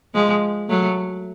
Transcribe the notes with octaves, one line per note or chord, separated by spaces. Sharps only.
F3 G#3
F#3 A3